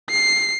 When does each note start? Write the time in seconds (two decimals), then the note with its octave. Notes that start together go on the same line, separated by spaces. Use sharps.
0.10 C7